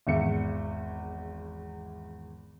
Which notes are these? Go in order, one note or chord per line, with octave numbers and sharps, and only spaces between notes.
G#1 E2 E5 C#7